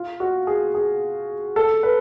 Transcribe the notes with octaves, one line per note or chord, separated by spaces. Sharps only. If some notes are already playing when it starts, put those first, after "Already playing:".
Already playing: F4
F#4
G#4
G#4
A4
B4